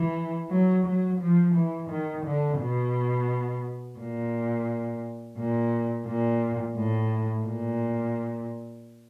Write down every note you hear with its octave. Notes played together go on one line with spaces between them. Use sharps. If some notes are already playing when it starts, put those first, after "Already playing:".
Already playing: E3
F#3
F#3
F3
E3
D#3
D3
B2
A#2
A#2
A#2
A2
A#2